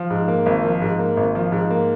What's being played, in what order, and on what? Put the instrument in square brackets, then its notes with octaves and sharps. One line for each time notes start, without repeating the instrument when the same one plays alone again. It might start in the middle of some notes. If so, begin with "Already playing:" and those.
Already playing: [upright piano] F3
G#2
A#3
G#1
F3
G#2
A#3
G#1
F3
G#2
A#3